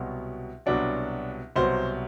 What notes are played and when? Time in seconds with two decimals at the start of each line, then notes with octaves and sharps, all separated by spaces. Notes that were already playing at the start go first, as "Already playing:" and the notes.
Already playing: C2 B2 F#3
0.66 C2 B2 F#3 D4
1.56 C2 B2 F#3 C5